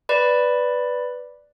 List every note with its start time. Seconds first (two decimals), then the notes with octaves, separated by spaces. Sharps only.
0.09 B4 D5 B5